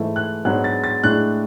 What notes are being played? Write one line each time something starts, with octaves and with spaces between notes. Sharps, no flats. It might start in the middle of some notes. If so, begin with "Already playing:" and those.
Already playing: G#2 E3 A3 E4
F#6
G#2 F#3 B3 D4 F#6
A6
A6
A2 G#3 D4 F#6